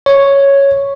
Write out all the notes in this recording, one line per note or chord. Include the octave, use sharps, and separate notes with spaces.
C#5